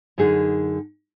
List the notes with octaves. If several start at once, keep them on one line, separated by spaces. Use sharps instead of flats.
F#2 D3 D#4 G#4